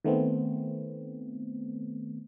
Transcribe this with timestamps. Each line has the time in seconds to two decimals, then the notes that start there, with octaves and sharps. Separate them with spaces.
0.04 D#3 A3 B3 C4